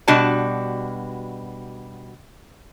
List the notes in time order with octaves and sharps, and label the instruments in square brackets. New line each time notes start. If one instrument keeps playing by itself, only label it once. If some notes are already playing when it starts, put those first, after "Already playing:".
[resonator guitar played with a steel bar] B2 G3 D4 F#4 A5